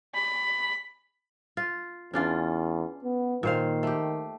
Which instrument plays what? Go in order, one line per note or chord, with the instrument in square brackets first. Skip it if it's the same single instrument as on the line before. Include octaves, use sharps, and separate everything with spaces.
[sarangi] B5
[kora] F4
[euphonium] E2 [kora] C#4 D4 F4
[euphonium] B3
[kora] A#2 C5 F5 [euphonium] D#3
[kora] A3 G4